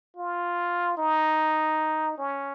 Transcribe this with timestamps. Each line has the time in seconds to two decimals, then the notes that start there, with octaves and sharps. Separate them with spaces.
0.17 F4
0.97 D#4
2.18 C#4